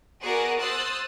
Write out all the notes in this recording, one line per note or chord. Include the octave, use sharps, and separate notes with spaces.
B3 F#4 G#4 A#4 D5 F#5
C5 D#6 E6 F#6 A6 C7